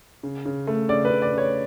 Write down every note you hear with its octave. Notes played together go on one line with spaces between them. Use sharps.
C#3
C#3
A3
C#3 D5
B4
C#3
D5
C#3 C#5